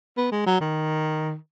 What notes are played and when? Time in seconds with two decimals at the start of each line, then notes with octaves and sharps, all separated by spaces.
0.17 B3
0.32 G#3
0.46 F#3
0.61 D#3